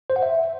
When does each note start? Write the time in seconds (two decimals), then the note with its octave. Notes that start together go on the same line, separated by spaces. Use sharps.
0.10 C5
0.16 F#5
0.23 E5